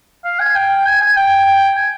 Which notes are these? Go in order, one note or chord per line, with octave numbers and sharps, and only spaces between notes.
F5
G#5
G5
G#5
G#5
G5
G#5